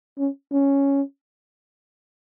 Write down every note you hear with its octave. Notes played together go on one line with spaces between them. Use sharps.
C#4
C#4